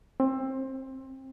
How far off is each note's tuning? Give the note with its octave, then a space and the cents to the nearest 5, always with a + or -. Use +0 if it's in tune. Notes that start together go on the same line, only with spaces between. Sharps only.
C4 +25